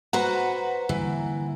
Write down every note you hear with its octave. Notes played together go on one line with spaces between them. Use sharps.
F#4 B4 C5 F#5 A#5
D3 E3 G3 A#3